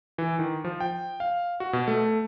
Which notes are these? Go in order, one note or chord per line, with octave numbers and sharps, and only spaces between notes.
E3
D#3
F3
G5
F5
F#4
B2
A3